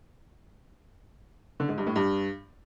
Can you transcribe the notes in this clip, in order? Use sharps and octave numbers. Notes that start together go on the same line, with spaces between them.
D3
G#2
G2
A2
G2